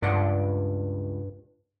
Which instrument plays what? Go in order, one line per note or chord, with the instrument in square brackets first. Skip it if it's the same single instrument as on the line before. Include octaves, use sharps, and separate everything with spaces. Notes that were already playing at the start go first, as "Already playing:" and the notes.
[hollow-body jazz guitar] C#2 D5 F#5 [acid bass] G2